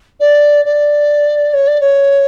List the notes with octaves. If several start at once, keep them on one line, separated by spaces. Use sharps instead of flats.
D5
D5
C#5
D5
C#5